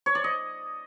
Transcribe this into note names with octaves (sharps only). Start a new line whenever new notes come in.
C#5
D5
D#5